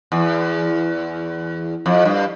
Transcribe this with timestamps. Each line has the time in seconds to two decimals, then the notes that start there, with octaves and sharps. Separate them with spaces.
0.12 E2
1.86 F2
2.05 G2